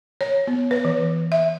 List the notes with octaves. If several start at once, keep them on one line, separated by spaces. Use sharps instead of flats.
C#5
B3
B4
E3
E5